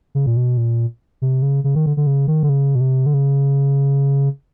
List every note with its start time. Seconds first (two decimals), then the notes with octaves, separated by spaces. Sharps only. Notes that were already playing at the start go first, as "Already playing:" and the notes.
0.15 C#3
0.26 A#2
0.37 B2
0.57 A#2
1.22 C3
1.42 C#3
1.64 C#3
1.75 D#3
1.86 D3
1.97 D3
2.07 C#3
2.27 D#3
2.43 D3
2.49 C#3
2.75 B2
2.81 C3
3.06 D3
3.14 C#3